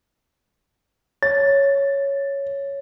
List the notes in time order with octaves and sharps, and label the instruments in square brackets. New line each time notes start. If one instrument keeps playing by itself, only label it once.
[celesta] C#5 [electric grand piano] A6